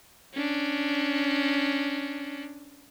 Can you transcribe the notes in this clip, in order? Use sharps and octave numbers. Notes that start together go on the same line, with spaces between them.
C#4 D4